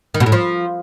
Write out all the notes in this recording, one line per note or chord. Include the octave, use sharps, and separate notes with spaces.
D#3
B2
A2
F3